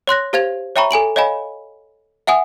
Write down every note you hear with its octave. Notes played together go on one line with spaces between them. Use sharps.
C#5 C6 F#6 A#6
G4 C5 F5 G#6 A6 F7
C#5 E5 G5 A#5 B5 C#6
A4 G#5 D7 F#7
C#5 D#5 F5 G#5 B5
E5 F#5 G#5 D#6